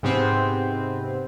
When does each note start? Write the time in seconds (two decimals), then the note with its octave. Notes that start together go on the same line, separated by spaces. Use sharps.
0.03 G#2 C3 B3 C4